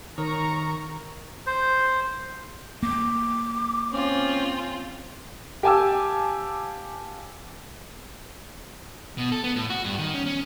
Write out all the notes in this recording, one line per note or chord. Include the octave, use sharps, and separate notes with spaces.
D#3 A#4 C#5 A#5 C#6
C5
A#3 D6
C4 C#4 F4
G4 F5 G#5 A5 D6 E6
B2
A4
B3
A2
F#4
G2
D#3
C#4
C#4